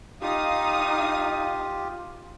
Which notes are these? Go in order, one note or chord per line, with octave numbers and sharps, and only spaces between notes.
D#4 F4 G4 F5 D#6